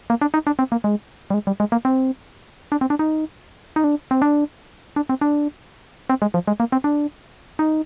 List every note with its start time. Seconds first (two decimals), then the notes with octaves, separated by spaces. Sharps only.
0.10 A#3
0.21 D4
0.34 D#4
0.47 D4
0.59 C4
0.72 A#3
0.84 G#3
1.30 G3
1.34 G#3
1.47 G3
1.60 G#3
1.72 A#3
1.85 C4
2.72 D4
2.81 C4
2.90 D4
2.99 D#4
3.76 D#4
3.84 D4
4.11 C4
4.22 D4
4.96 D4
5.09 C4
5.21 D4
6.10 C4
6.22 G#3
6.34 F3
6.47 G#3
6.60 A#3
6.72 C4
6.84 D4
7.59 D#4